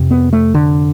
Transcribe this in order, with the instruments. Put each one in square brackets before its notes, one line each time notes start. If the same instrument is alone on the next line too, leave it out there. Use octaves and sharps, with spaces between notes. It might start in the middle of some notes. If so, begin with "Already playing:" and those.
Already playing: [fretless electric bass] F2 C3
B3
A3
D3